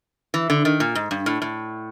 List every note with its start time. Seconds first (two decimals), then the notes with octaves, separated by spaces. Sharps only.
0.34 E3
0.50 D3
0.65 D#3
0.80 A#2
0.95 G#2
1.11 G2
1.26 A2
1.42 A2